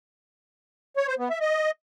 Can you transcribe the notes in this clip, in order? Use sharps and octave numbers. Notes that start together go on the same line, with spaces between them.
C#5
C5
B3
E5
D#5